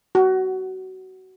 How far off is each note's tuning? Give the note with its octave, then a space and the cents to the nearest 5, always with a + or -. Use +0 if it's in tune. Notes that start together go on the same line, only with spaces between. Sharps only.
F#4 +20